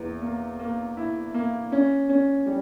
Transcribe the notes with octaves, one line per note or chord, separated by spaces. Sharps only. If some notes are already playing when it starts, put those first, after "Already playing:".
Already playing: E2 A#3
A#3
A#3
E4
A#3
C#4
C#4
G3